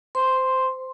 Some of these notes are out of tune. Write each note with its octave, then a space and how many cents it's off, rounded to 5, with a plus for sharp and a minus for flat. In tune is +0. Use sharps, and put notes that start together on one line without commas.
C5 -15 C6 +0